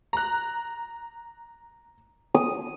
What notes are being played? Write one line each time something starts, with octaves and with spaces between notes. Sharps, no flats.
A#5 F#6
D#6